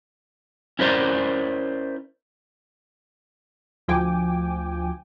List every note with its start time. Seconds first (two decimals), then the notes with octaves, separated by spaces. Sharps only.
0.79 C#4 E4 A#4 C5 D5
3.88 D2 F3 G5 G#5 D6